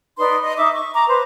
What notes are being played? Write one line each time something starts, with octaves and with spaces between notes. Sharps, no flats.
D#4 B4 D5 C6
D#5
D#4 E5 D6
C#6
A#5 D6
B4 C5